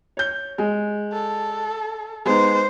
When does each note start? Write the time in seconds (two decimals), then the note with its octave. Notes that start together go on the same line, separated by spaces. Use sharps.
0.17 C#5 G6
0.58 G#3
1.13 A4
2.25 G#3 B3 D#4 C5